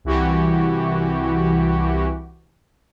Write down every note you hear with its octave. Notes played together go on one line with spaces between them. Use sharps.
C2 E3 F#4 G4